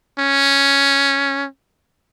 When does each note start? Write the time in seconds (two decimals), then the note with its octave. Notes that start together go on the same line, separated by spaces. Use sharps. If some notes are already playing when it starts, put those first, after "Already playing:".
0.19 C#4